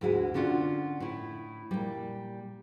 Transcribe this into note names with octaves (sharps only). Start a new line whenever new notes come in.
D2 G#2 G#3 E4 F#4 G#5
D3 C#4 D4 F4 F#5
A2 E4
A#2 G3